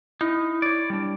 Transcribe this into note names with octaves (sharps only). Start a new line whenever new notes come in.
D#4 E4
C#5 D5
G3 D4